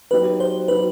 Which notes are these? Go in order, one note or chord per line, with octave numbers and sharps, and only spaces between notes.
F#3 B3 D#4 G4 B4
C5
F#3 B3 D#4 G4 B4